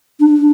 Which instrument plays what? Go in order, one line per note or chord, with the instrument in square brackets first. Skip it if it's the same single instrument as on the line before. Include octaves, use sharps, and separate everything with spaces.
[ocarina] D4